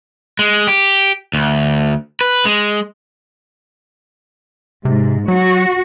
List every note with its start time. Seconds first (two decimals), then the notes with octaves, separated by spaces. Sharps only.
0.39 G#3
0.67 G4
1.33 D2
2.21 B4
2.45 G#3
4.85 G#2 C3
5.28 F#3 F#4